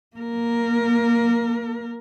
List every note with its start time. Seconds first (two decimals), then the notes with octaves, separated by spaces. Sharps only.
0.17 A#3 A#4